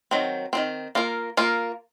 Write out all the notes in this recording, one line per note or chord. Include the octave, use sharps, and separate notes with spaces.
D#3 F#3 C4
D#3 F#3 C4
A#3 F4 A#4
A#3 F4 A#4